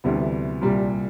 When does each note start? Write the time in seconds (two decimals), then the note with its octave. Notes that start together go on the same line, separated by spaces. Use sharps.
0.04 D2 C3 E3 G3 B3
0.61 C2 A#2 G3